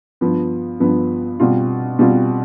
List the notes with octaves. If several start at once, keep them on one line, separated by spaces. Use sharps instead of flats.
G2 F3 B3
G2 F3 B3
B2 G3 C4 F4
B2 G3 C4 F4